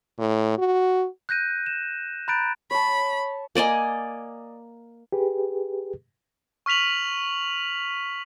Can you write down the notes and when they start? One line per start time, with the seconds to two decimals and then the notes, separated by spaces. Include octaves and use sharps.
0.19 A2
0.58 F#4
1.29 F#6 G6 A#6 D#7
1.66 E7
2.28 A#5 B5 F#6 G6 A6 D7
2.71 C#5 A5 B5
3.55 A#3 D5 D#5 G#5
5.12 G4 G#4 B4
6.66 C#6 F6 B6 F7 F#7